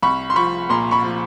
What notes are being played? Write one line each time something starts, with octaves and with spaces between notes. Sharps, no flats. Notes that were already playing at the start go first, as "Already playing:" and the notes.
C2 B5 C#6
C6
F3 B5 C#6
A#2 A#5 C6
B5 C#6
F3